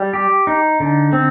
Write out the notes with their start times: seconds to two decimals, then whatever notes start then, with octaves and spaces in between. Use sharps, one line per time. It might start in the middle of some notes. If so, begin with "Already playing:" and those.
Already playing: G3
0.13 G4
0.47 D#4
0.80 D3
1.13 C4